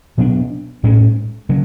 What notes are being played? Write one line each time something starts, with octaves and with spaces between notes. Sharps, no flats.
B2 F#3 B3 D4
A2 G#3 C#4
C#3 F#3